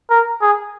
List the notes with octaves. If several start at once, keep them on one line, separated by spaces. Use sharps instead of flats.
A#4
G#4